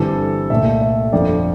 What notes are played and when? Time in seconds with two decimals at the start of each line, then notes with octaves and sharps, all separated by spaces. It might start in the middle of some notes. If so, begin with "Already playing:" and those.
Already playing: G1 G2 E3 G3 C4 A4
0.50 C2 A#2 A3 E5
0.81 E5
1.13 G1 F2 D3 F3 D5